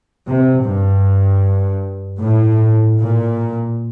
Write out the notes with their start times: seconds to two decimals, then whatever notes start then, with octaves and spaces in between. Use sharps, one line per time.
0.26 C3
0.65 G2
2.19 A2
2.97 A#2